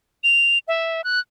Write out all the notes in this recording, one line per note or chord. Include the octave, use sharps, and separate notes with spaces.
F7
E5
F#6